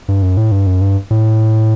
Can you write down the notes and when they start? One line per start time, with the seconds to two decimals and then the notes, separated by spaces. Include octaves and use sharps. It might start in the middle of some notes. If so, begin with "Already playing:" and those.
0.08 G2
0.22 F#2
0.37 A2
0.52 G2
0.67 F#2
0.81 G2
1.11 A2